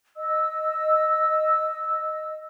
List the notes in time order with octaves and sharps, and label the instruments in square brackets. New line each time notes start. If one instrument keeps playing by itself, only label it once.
[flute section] D#5 E6